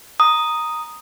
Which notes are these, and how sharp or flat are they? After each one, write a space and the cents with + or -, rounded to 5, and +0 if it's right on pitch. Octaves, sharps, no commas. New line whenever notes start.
A#5 +0 D#6 +0